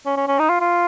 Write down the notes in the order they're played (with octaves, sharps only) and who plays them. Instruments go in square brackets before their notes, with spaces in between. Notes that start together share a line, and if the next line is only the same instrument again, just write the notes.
[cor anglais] C#4
C#4
C#4
D#4
F4
F4